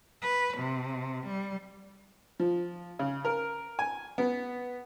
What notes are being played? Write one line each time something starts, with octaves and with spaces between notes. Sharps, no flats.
B4
C3
G3
F3
C#3
A#4
G#5
B3